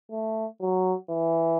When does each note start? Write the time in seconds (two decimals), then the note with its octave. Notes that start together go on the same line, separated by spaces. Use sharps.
0.11 A3
0.61 F#3
1.10 E3